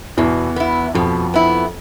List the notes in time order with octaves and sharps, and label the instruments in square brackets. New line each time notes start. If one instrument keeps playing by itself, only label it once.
[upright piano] E2 E3 [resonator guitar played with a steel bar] B2
[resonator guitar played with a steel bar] B3 E4
[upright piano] F2 F3 [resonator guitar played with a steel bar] B2
[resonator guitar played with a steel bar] B3 E4